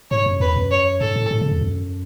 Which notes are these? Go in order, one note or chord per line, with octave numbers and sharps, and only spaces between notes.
G#2 C#5
F#2
E2 B4
F#2
C#5
G#2 A4
A2
A2
C#3
E2
F#2